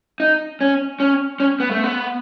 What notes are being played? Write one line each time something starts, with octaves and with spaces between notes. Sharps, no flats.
D#4
C#4
C#4
C#4
B3
A3
B3